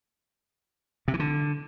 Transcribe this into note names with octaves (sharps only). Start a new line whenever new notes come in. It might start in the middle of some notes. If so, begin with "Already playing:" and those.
C3
E3
D3